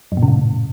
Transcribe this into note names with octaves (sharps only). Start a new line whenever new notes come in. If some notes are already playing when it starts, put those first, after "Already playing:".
F#2
A#2
C#3
A2